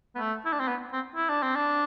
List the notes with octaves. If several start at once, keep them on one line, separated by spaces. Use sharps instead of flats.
B3
A3
E4
D4
C4
B3
C4
E4
D4
C4
D4